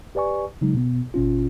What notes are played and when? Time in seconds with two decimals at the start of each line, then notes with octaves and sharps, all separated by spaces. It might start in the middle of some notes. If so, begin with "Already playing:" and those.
0.15 G4 B4 D5 G#5 C#6
0.61 C#3 F#3 G#3 D#4
0.74 B2 B3
1.14 G#1 B2 C#4 F4